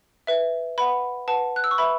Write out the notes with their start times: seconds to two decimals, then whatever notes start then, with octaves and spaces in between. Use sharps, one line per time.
0.27 B4 E5
0.78 B4 F#5 B5
1.28 B4 F#5 A5
1.56 F#6
1.64 E6
1.71 C#6
1.78 B4 E5 B5